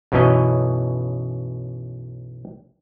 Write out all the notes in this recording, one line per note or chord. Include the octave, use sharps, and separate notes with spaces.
B1 F#2 B2 E3 C#4 D#5